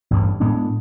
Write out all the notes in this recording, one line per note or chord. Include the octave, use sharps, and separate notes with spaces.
A1 G2
A2 G#3 B3 D4